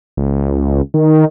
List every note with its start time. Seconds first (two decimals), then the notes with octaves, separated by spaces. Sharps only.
0.17 C#2
0.94 D#3